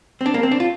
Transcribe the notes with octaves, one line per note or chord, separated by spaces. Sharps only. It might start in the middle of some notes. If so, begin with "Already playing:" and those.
C4
D4
A#3
C4
D4
F4